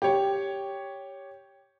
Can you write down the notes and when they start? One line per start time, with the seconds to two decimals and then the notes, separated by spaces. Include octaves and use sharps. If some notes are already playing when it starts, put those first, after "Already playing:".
0.02 G4 C#5